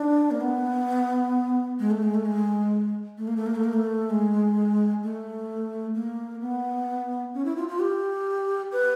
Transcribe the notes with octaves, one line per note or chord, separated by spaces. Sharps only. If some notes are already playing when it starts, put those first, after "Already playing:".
Already playing: D4
A#3
B3
G#3
A3
G#3
A3
G#3
A3
A#3
A3
A#3
A3
A#3
A3
G#3
A3
A#3
B3
C#4
E4
F4
F4
G4
B4